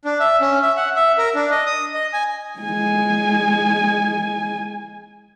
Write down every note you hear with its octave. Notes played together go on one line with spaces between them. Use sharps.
D4
E5
C#4
E5
F#5
E5
A#4
D4
D#5
D#6
D#5
G#5
G#3 G#5